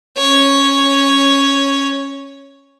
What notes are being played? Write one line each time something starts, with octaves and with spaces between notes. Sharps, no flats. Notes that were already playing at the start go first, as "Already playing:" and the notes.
C#4 C#5